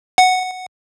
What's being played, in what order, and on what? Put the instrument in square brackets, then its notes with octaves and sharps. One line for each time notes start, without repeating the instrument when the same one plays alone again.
[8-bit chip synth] F#5